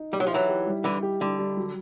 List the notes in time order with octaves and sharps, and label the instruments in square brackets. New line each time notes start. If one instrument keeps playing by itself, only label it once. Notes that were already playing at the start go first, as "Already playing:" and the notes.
Already playing: [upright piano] D#4
[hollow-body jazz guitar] G3 [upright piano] G4
[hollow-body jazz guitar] F#3
F3
[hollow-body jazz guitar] E3 F#3 [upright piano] E4
[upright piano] G4
G3
[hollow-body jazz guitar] D3 E3 [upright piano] G3
[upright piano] G4
[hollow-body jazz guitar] D3 [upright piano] G3
[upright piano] G3
F#3